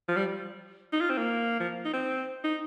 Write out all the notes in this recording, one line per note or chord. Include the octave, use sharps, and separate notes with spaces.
F3
G3
D#4
F4
C4
A#3
F3
D#4
C4
D#4